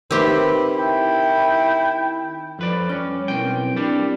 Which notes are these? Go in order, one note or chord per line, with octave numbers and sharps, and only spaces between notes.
D#3 C4 G4 B4 E5 C6
E4 G5
F2 B4 D5
G3 C#4 D6
B1 C4 E4 A#4 G5
G3 D4